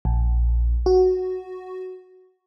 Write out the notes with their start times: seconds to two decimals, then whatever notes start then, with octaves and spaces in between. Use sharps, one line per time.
0.05 A#1
0.86 F#4